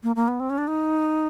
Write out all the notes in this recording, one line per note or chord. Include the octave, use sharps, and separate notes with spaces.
A#3
A#3
B3
C4
C#4
D4
D#4